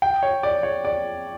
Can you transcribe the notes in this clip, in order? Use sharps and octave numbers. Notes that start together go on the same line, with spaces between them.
G5
C#5
D5
C#5
D5